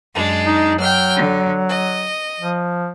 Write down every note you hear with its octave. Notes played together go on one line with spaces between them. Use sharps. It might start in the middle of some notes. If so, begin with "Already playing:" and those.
F#2 G#3 D4
D#4
F#3 G5 F6
D3
D#5
F3